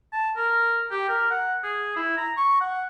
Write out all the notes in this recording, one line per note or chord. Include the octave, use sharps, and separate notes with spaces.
A5
A#4
G4
A#4
F#5
G#4
E4
A#5
C#6
F#5